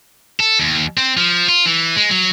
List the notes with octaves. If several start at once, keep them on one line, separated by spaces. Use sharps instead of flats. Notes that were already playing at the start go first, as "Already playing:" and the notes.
A4
D#2
C4
F3
F4
E3
G#3
F#3